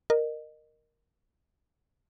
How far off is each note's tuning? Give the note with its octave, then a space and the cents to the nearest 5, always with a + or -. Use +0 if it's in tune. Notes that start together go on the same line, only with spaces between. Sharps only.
A#4 +0 D#5 -25